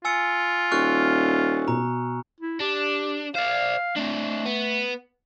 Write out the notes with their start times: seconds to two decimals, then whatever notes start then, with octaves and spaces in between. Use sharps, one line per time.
0.05 F4 G#5 E6 C#7
0.72 D#1 C#6 F6 F#6
1.68 B2 A#5
2.40 E4
2.60 D4 G4
3.35 C5 D5 F5
3.97 A3 C4 D4
4.46 B3